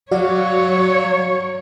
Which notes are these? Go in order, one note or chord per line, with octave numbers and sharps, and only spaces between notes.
F#3 F#4 C#5 D5 F5